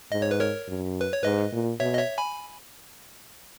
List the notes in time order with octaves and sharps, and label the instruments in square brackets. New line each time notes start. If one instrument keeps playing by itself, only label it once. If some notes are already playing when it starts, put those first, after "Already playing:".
[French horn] G#2 [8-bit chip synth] D#5
[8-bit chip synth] C#5
B4
A#4 C#5
[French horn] F#2
[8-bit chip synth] B4
C#5
[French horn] G#2 [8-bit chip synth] B4 D#5
[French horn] A#2
[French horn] B2 [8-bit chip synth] C#5 E5
[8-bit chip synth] D#5
C#5 E5
G#5 B5